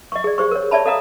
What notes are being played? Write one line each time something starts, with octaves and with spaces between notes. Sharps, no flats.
D#5 C#6
G#4 D5
G4 G#4 C5 C#6
A#4 C#5
C#5 D5 E5 A5 B5
A4 D#5 F5 A#5 D#6